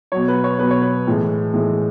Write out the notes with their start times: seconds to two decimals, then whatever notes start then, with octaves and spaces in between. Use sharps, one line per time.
0.12 B2 F#3 C#5
0.28 B4
0.44 C#5
0.59 B2 F#3 B4
0.71 C#5
0.82 B4
1.07 A2 E3 G#3
1.53 A2 E3 G#3